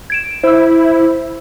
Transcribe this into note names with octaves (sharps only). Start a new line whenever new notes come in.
G#6 D7 E7
E4 C5 E6